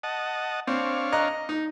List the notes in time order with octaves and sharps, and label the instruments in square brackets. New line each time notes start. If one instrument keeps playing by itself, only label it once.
[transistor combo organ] D#5 F#5 A5
[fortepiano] C4 [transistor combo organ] D4 C#5 F5
[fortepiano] D#5 A#5 F#6
D#4